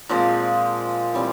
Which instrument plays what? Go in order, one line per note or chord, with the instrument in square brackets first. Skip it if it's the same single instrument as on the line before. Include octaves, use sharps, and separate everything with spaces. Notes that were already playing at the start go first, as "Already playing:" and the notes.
[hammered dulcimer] A#2 F3 G#3 C4
E3 G3 C4